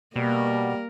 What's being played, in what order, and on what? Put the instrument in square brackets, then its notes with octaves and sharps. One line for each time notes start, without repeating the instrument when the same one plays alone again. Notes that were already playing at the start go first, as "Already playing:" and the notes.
[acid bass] B2 [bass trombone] G3 [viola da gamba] A#3 A#4